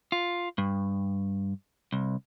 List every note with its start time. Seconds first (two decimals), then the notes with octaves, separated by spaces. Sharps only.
0.12 F4
0.58 G2
1.93 C2